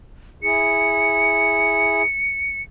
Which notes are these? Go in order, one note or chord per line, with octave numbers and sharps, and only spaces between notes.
E4 G#4 C#7